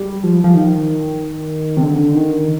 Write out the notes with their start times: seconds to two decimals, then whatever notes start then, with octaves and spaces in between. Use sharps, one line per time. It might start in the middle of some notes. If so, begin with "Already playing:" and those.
Already playing: G3
0.24 F3
0.44 F3
0.55 D#3
1.77 C3
1.83 D3
2.14 D#3